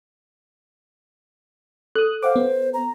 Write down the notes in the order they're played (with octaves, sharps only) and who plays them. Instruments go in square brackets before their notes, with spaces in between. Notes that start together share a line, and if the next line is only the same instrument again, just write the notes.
[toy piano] A4 [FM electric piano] D#6 F#6
[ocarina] C5 [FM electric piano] F5 F#5 D6
[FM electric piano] B3
[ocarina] A#5